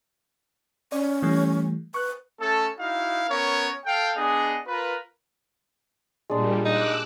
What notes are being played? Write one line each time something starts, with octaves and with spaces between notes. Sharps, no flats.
C#4 D5
E3 G3 A3
B4 C#6 F#6
A3 C#4 A4
D#4 E4 F#4 F5
B3 C#4 A#4 C#5
A4 F5 G5
B3 D4 G#4 D#5
F4 A#4 B4
A#2 G3 G#3 D4
D#4 D6 E6 F#6